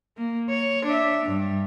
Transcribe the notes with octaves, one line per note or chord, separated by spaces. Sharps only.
A#3
C#5
D4 E5
G2